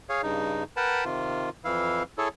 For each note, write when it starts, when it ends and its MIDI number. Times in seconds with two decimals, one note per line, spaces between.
0.09 0.22 68
0.09 0.22 73
0.09 0.22 77
0.23 0.64 43
0.23 0.64 49
0.23 0.64 63
0.77 1.04 70
0.77 1.04 71
0.77 1.04 78
0.77 1.04 79
0.77 1.04 81
0.77 1.04 83
1.05 1.50 48
1.05 1.50 51
1.05 1.50 65
1.65 2.03 41
1.65 2.03 52
1.65 2.03 64
1.65 2.03 77
2.18 2.28 64
2.18 2.28 68
2.18 2.28 69
2.18 2.28 73